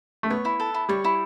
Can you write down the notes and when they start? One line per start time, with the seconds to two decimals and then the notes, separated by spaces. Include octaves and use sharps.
0.23 A3
0.30 B3 C#5
0.45 E4
0.60 A4
0.74 E4
0.89 G3 C#5
1.05 E4